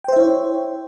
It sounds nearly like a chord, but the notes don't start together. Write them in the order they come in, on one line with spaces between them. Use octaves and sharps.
G5 C5 E5 E4 C#5